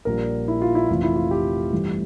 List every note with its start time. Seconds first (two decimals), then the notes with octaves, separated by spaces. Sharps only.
0.05 A#1 A#2 G3 A#4
0.48 E4
0.62 F4
0.75 E4
0.89 F1 F2 E3 F4
1.03 E4
1.16 F4
1.31 G4
1.72 G2 E3 A3 C4